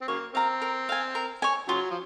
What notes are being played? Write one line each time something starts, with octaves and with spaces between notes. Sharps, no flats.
C4
C#3 F#3 A#3 C#5
C4 F5 A#5
A#4
F5 G#5
A#4
C#5 G#5
C#3 F#3 F4
F3